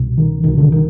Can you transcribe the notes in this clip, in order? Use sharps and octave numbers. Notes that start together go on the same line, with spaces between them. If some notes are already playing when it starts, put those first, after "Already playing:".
Already playing: C2 B2
D#3
C2 B2 D#3
D3
D#3